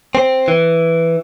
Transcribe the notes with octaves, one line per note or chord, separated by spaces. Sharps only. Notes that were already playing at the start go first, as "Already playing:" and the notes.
C4
E3